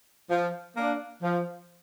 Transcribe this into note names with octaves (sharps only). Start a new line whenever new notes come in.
F3
A#3 D4
F3